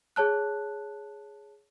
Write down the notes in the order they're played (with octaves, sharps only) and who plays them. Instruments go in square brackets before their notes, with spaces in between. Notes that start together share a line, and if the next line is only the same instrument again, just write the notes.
[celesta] G#4 C#5 A5 F#6